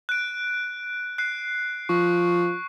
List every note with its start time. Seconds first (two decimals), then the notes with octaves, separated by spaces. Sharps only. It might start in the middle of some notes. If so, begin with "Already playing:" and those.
0.09 F#6 D7
1.18 F#6 C7
1.89 F3 C#6